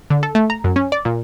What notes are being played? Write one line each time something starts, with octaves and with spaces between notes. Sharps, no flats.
D3
A4
A3
A#5
F#2
C#4
D5
A#2